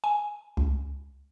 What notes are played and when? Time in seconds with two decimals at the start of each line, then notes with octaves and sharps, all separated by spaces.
0.04 G#5
0.57 C#2